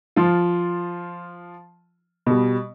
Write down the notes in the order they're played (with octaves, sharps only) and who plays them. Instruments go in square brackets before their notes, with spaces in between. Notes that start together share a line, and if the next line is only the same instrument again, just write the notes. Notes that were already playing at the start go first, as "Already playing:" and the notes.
[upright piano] F3 F4
B2 G3